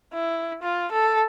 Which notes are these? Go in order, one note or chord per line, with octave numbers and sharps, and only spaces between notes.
E4
F4
A4